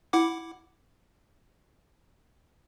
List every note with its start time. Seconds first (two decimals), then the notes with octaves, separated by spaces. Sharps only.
0.13 E4 F#5 D6